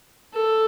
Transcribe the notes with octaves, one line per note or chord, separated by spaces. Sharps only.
A4